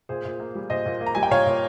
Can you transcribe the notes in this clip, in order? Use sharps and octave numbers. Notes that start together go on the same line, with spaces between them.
A#2 G#4 C5
A#2
A#3
G3
A#2 C5 D#5
A#2
A#3
A#5
G3 G#5
G5
A#2 C#5 F5
A#2